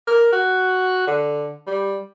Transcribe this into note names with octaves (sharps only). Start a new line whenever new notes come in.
A#4
F#4
D3
G3